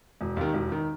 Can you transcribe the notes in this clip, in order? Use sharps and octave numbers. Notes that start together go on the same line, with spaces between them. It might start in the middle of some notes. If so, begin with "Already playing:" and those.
E1
D#2 D#3
E1
D#3